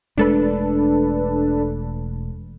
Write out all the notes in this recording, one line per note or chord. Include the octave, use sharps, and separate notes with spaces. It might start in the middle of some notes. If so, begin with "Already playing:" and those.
E1 G#3 A3 D4 A4 B4